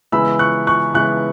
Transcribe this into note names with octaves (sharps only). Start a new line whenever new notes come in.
C#3 E3 G#3 B3 E4 B5 E6
C#6 F#6
C#6 F#6
C#3 E3 G#3 B3 E4 C#6 F#6